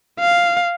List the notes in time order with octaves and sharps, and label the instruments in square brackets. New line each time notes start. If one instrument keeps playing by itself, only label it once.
[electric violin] F5